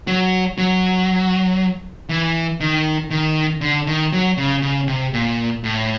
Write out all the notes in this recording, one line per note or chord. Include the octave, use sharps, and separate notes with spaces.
F#3
F#3
E3
D#3
D#3
D3
D#3
F#3
C#3
C#3
C3
A#2
A2